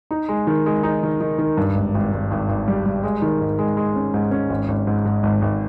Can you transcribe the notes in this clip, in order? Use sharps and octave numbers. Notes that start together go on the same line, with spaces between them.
D#4
G#3
D#3
G#3
D#4
D#3
D#3
D#3
G2
G#1
G#1
G#1
G#1
G#1
G3
G3
G#3
D#3
G#2
G#3
G#3
C#4
G#2
C#4
G#1
G#1
G#2
G#2
G#1
G#1